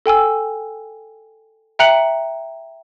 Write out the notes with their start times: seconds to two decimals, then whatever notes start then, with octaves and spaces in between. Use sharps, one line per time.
0.06 A4 G5 G#5 E6
1.79 E5 G5 A#5 F#6 C#7 F#7